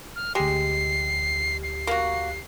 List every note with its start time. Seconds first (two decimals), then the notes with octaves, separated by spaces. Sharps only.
0.16 F6
0.35 D2 G#3 G4 C7
1.63 C7
1.87 A#3 F#4